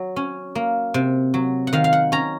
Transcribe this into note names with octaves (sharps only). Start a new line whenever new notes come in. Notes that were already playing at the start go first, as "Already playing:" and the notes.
Already playing: F#3
C#4
A#3
C3
F#3
F#5
D#3 F5
F5
F#5
C#4 A#5